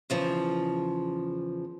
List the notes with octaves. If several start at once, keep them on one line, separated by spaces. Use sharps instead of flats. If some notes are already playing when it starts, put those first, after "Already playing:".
E2 C#3 F3